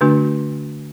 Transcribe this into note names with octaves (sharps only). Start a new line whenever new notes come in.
D3 A3 D4 F#4